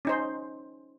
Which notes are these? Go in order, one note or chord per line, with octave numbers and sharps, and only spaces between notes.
C#4 D#4 C5